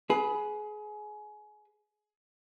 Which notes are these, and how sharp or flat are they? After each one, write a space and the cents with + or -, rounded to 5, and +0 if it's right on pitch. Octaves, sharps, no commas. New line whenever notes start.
G#4 +25 B4 -5